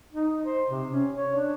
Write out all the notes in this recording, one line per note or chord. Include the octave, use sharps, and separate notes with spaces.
D#4
C5
C3
C#4
C#5
D4